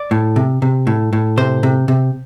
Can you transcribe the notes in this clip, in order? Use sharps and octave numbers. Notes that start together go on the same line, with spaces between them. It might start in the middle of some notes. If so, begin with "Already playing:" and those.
Already playing: D5
A2
C3
C3
A2
A2
C3 C5
C3
C3